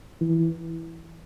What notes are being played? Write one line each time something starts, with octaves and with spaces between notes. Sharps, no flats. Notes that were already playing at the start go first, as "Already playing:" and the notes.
E3